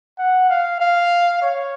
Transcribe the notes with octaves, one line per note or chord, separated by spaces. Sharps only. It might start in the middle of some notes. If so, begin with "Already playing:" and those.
F#5
F5
F5
C#5